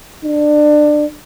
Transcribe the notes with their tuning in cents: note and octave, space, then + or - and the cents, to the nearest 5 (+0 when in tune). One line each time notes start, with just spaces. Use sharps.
D4 +25